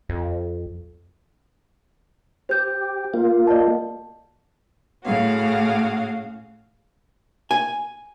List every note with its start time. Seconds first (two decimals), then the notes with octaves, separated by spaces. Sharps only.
0.09 F2
2.49 G4 C5 G6
3.14 A#3 F4
3.47 D5 D#5 A5
5.06 A2 C#3 F#4 F5
7.51 G#5